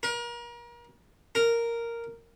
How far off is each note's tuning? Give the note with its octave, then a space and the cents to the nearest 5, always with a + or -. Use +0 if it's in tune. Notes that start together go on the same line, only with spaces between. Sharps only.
A#4 +35
A#4 -5